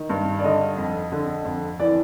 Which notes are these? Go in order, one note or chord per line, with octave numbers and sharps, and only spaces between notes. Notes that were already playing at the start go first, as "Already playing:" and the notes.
Already playing: D#3
G2
D5
D3 D#5
F2
D3
F2
E3 D5